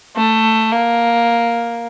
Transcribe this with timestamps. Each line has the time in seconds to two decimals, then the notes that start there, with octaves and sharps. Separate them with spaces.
0.17 A3
0.72 A#3